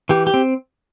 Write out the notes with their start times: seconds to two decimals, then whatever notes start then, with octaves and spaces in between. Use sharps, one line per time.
0.09 E3 G4
0.27 G4
0.34 C4